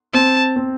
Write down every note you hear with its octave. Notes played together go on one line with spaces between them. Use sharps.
C4 A5
C4